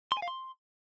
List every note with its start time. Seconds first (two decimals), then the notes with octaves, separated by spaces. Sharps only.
0.12 C6
0.17 G#5
0.22 F5
0.28 C6